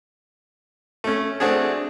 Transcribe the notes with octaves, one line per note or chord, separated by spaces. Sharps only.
A3 C#4
A3 C4 D4 F#4 G#4